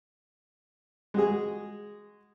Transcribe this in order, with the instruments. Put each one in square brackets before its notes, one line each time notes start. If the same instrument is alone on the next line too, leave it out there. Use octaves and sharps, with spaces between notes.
[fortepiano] G#3 F#4 G#4